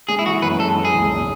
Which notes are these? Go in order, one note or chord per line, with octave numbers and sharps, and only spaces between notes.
G#3 G#4
E4
E3 F#4
F#2 B4
G#3 A4
E3
G#4
C#2
G#1